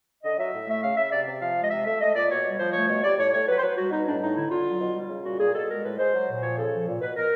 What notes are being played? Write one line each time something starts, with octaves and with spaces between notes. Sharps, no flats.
D3 D#5
F#3 E5
A2
A3 E5
C#3 F5
C#3 E5
C3 D5
C3
F3 F5
G#3
D#5
C3 E5
A3 E5
A3 D#5
A#2 D5
B2 C#5
G3
F3 C5
A3 C#5
B2 C#5
G3 D5
A2 C#5
A2 C#5
F#3 B4
C5
F#3 B4
G3 F#4
B2 D#4
A2 D4
A2 D#4
D3 E4
D3 F4
F#3
B2
G3
C#3
A#2 F#4
A#2 G#4
B2 A4
G#3 A#4
A2 B4
G#3 C5
F#3
A#2
F3 C#5
C#3 A4
F3
A#2
B2 B4
B2 A#4